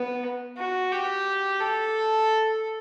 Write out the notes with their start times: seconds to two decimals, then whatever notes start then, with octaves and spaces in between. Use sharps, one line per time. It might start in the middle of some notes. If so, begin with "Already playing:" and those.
Already playing: B3
0.58 F#4
0.92 G4
1.60 A4